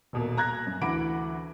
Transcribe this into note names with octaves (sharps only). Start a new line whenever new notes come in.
D#1 B2 A#3
A#5 F#6 G#6 A#6
F#2
D2 E3 F#5 B5 D6 D7